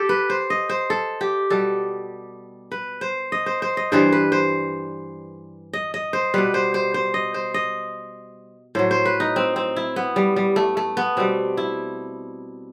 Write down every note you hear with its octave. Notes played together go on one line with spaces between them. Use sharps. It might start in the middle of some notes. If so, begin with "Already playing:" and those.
Already playing: G4 A4
B4
C5
D#5
C5
A4
G4
B2 G3 A4
B4
C5
D#5
C5
C5
D#5
G2 E3 G3 C5
B4
C5
D#5
D#5
C5
B2 G3 B4
C5
C5
C5
D#5
C5
D#5
A2 F#3 C5
C5
B4
D#4
C4
C4
E4
B3
G3
G3
A3
A3
B3
B2 G3 C4
E4